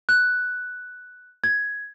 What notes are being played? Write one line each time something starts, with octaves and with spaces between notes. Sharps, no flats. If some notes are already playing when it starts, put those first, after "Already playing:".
F#6
G#6